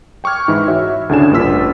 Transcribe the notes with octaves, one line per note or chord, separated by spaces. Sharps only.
G5 C#6 D6 F6 G#6
G#2 E3 D#4 E4
F#4 C#5 E5
D2 A2 C#3 D4 G#5 E7
A1 G2 A#3 F4 E6 B6